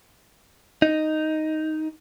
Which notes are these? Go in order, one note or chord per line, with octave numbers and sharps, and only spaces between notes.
D#4